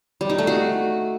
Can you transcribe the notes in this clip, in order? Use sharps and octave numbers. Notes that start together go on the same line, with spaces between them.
G3
D#4
A3
F#4